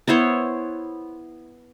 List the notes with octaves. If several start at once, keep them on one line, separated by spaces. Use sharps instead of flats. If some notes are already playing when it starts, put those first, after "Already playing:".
B3 E4 C5 C#5